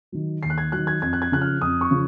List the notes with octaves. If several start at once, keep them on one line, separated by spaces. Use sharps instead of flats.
D#3 F#3
D#2 C7
F#6
G#6
D#3 F#3 F#6
G#6
F2 G#6
F#6
G#6
C#3 F3 F#6
F6
F2 D#6
C#6
C#3 F3